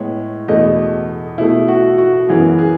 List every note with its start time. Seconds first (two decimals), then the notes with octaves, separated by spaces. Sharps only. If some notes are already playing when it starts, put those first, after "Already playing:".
Already playing: A2 G#3 B3 C#5
0.48 E2 B2 A3 D#5
1.38 B2 A3 E4
1.68 F#4
1.98 F#4
2.28 F#2 E3 B3 G#4
2.59 G#4